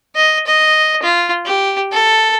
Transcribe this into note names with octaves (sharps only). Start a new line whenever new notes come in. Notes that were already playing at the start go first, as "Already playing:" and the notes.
D#5
D#5
F4
G4
A4